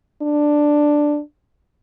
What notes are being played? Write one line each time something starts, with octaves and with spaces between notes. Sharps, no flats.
D4